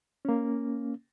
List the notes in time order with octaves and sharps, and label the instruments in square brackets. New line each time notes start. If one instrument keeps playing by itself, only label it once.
[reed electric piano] A#3 C#4